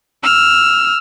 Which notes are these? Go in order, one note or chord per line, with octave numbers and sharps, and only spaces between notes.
E6 F6